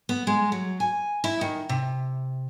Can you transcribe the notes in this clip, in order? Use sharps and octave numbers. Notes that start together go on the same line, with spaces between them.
B3
G#3
F#3
G#5
E4
D#3
C3